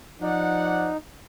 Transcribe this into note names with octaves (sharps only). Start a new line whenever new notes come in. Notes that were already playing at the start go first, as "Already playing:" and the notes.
F3 D#4 D5 F#5